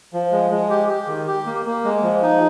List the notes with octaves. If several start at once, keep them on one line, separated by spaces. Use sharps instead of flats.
F3
G#3
G#3
G4
G4
D#3
G4
A#3
A#3
G#3
F3
D#4